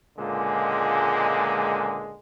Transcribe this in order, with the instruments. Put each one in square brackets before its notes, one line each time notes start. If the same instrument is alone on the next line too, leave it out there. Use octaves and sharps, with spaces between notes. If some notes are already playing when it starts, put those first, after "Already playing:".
[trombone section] C#2 A#2 D3 G#3